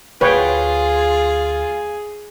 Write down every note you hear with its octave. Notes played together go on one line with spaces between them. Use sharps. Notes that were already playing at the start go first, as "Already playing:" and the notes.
D2 F4 G#4 B4 C#5 G5